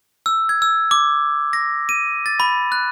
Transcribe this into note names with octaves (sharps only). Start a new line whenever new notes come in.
E6
G#6
E6
D6
A#6
D#7
A6
B5
F#6